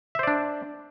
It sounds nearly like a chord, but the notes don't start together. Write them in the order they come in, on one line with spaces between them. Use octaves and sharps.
E5 C5 D5 D4